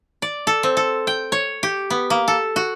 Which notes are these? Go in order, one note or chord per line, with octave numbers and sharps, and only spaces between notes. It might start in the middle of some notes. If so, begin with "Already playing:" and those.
D5
A4
C4
A4
G5
C#5
G4
B3
A#3
A4
F#4